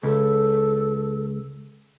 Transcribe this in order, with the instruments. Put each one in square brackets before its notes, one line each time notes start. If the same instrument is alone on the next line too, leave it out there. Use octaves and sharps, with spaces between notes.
[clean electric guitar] C#2 [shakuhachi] A4